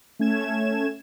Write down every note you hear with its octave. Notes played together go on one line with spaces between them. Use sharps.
A3 C#4 G#6 E7